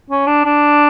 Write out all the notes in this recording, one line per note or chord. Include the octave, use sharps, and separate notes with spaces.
C#4
D4
D4